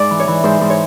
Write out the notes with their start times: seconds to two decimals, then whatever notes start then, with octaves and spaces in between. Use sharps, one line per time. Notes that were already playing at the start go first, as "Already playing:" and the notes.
Already playing: G#2 D5
0.10 E3
0.19 C#5
0.28 E3
0.44 G#2 C5
0.61 G#2
0.70 C#5